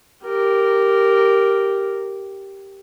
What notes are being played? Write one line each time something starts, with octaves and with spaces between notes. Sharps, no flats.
G4 A#4